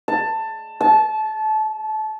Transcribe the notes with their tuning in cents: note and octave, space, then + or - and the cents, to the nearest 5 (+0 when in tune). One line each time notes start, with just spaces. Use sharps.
A5 +15
A5 -25